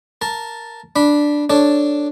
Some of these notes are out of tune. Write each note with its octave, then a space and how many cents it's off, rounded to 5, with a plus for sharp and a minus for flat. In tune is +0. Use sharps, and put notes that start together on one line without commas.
A#4 +0 A5 +0
D4 +0 B5 -15
D4 +0 A4 +0 C#5 +0